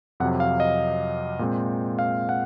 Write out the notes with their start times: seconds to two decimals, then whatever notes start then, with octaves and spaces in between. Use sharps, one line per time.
0.20 F2 C3 F#3 F#5
0.40 F5
0.60 D#5
1.39 A#2 G#3 C4
1.99 F5
2.29 F#5